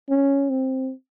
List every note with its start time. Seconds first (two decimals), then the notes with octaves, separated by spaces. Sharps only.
0.10 C#4
0.50 C4